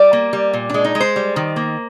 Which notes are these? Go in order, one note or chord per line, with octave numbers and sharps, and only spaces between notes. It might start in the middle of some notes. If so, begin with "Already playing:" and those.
Already playing: G3 D5
A#3
G3
A#2
G#3 D4
D#4
G#3
C5
G3
D#3
A#3